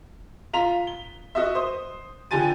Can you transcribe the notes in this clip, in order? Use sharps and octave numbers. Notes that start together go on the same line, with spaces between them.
F4 A#5 B6 F7
G7
F#4 D#5 E5
C5 D#6
D3 F3 G4 G#5 A6 D#7